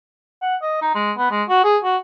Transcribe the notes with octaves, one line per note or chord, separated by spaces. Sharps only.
F#5
D#5
D#4
G#3
B3
G#3
F#4
G#4
F#4